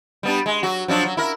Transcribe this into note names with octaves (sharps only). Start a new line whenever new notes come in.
G3 B3 D4
G#3
F#3 F#4
F3 F#3 D4
F#3
E4 A#4